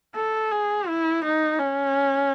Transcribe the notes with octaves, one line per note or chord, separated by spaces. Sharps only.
A4
G#4
E4
D#4
C#4